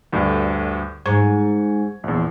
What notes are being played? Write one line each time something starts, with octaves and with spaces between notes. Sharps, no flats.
D2 G2 D3
G#2 C#6 G#6
A#1 E2